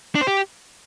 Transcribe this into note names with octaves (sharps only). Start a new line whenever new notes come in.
D4
C5
G4